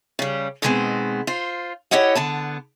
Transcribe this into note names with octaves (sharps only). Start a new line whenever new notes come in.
C#3 G3
B2 D#3 G3 G#3 B3 C4
F4 C5
E4 G4 C#5 D#5 F#5
D3 B3 A5